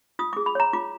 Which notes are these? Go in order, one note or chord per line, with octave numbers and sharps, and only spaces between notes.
F4 D#6
G#4 D6
B5
C#5 A#5
F4 D6